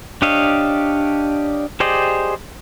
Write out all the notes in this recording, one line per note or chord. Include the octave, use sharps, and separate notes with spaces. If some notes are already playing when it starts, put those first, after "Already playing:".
D4 G4 C#5 D#5 F5
G4 G#4 C5 D5 D#5